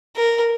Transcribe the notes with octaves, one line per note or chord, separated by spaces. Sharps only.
A#4